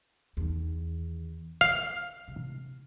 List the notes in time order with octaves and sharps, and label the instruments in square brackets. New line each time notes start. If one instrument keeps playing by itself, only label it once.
[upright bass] E2 D#3
[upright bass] F4 [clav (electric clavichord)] F5
[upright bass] C3